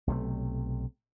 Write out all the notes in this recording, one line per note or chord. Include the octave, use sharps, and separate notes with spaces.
B1 C3 D#3 A3